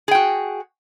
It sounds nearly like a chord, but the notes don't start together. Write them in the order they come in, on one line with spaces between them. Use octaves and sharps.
G#4 G5 F#4